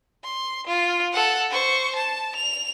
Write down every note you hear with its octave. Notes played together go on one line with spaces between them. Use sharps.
C6
F4
A4 F#5
C5 C#6
A5
F7